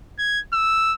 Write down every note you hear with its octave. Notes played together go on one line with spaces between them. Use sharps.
G#6
E6